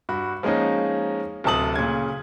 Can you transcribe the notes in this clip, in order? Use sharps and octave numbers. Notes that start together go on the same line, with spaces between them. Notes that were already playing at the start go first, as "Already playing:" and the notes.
G2 F#4 B5
F3 G#3 A#3 C#4 D#4
D1 C3 A4 A5 D#6 F#7
A#2 C#3 G#6